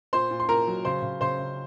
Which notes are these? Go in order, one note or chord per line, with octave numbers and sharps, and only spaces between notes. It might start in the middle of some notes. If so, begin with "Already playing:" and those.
A#2 C5 C6
A#2
C6
A#2 A#4 A#5
F#3
C#3 C5 C6
C#3
C#3 C5 C6
C#3